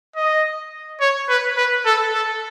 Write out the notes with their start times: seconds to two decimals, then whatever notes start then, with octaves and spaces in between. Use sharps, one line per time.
0.16 D#5
1.01 C#5
1.29 B4
1.57 B4
1.86 A4
2.14 A4